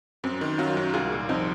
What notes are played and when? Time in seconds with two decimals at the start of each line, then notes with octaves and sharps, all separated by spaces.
0.24 F#2 C4
0.41 D#3
0.58 F#3 C#4 F4
0.77 F#2
0.94 C2 F4 G#4
1.12 A#2
1.29 F3 C4 D#4